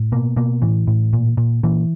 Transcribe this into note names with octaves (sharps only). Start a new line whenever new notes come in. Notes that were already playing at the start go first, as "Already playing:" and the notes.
Already playing: A2
B2 A#3
B2 A#3
A2 E3
A2
A#2
A#2
A#2 E3